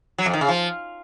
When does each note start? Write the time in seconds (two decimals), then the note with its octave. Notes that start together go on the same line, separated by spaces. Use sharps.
0.18 F#3
0.26 F2
0.33 D#3
0.41 C#3
0.48 F3